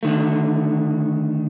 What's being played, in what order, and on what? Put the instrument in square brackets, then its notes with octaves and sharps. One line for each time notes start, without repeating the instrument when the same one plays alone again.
[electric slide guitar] D3 D#3 A3